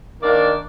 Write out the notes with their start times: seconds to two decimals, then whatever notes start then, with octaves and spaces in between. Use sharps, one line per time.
0.22 D#3 A#3 D4 D5